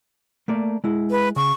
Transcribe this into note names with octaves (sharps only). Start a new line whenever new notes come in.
A3 A#3 D5
G#3 E4
B4
C#3 C#6